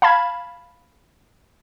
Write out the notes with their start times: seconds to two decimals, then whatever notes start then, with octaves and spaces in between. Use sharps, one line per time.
0.02 F5 A5 B5 G#6